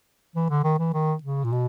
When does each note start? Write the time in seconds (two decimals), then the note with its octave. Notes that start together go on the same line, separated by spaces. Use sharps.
0.36 E3
0.50 D3
0.64 D#3
0.79 E3
0.94 D#3
1.23 C#3
1.44 A#2
1.52 B2